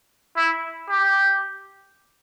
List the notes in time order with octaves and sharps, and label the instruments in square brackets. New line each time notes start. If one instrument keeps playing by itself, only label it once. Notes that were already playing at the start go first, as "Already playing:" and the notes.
[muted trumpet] E4
G4